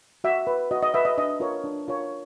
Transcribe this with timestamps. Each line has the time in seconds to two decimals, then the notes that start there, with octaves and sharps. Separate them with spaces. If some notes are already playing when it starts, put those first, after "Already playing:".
0.24 F#4 E5
0.47 B4
0.71 F#4 D#5
0.83 D#5
0.94 B4 E5
1.05 D#5
1.18 D4 D#5
1.40 F4 A#4 C#5
1.64 D4
1.88 F4 A#4 C#5